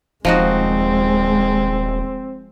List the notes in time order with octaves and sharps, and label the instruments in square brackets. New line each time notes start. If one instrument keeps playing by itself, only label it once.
[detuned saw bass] D#1 [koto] F3 D#4 F#4 [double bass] G#3 [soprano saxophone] C4